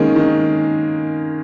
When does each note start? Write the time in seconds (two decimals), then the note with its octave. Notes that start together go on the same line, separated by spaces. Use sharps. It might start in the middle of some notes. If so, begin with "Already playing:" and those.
Already playing: D#3 G#3 A#3 C#4
0.16 D#3